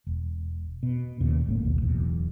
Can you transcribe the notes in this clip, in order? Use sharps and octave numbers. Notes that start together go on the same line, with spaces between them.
E1
B2
D#2 A#2 C#3
F#1 A2 A#3
A#1 D#2 B2
D1 B1 E2